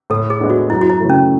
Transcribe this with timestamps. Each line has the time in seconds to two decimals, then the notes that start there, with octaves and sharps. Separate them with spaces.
0.10 A2 A4
0.30 G#4
0.40 G#3 B3 D4
0.50 F#4
0.70 F#2 E4
0.81 F#4
0.90 E4
1.00 C#3 E3 A3
1.09 C#4